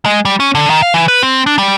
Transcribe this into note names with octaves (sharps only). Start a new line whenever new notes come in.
G#3
G3
C#4
D3
D#3
F5
E3
B4
C4
D4
G3